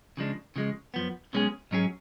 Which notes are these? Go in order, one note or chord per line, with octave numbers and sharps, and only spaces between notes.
C#3 F3 G#3 D4
C#3 F3 G#3
F#2 F3 B3
B1 B2 G#3 C#4 G#4
G#2 F#3 C#4 G#4